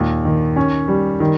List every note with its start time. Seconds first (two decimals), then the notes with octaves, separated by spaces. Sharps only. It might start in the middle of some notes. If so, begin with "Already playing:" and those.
Already playing: D#2 A#2
0.25 D#3
0.56 C#4
0.88 G3
1.20 D#3